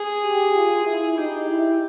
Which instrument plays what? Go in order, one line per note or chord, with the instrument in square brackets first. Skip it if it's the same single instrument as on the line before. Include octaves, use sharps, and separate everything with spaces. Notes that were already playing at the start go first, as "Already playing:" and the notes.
Already playing: [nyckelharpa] G#4
[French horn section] G4
F4
[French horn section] E4 [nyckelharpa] G#4
[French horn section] D#4 [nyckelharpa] G4
[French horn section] E4